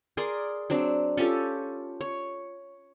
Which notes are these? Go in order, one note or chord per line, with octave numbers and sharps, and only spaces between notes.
G#4 A#4 D5 C6
F#3 C4 D4
C#4 F4 G4 A4
C#5